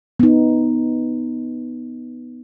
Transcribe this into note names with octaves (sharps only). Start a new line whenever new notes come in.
B3 D#4